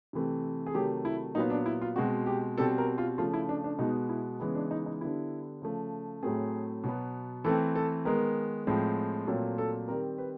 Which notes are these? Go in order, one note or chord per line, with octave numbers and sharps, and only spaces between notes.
C3 E3 A3 C4
G#4
C3 D#3 F#3 A3 G4
E4
A#2 F#3 B3 D#4
D4
E4
F4
B2 G#3 C4 F#4
G4
B2 G3 C4 A4
A#4
F4
C#3 F3 A3 F4
E4
D4
D4
B2 G#3 B3 D#4
E4
C#3 E3 G#3 B3
D4
D#4
D#4
D3 G3 B3 E4
C#3 F3 A3
A2 F#3 A3 C4 G#4
B2 F#3 B3
E3 A3 C4 A4
A4
D#3 G#3 B3 A#4
A2 F3 G#3 C4
A#2 F#3 A3 C4 A4
A4
D#3 G3 C4 A#4
B4